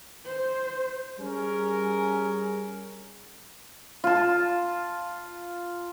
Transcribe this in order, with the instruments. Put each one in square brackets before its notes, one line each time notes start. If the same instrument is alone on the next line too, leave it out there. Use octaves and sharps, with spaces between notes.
[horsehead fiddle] C5
[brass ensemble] G3 C#4 G#4 A#4
[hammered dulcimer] F4 A5